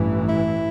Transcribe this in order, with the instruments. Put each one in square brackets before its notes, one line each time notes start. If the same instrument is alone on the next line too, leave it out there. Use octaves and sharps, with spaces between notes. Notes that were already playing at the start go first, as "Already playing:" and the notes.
Already playing: [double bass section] A1 G2 E3
[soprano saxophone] E4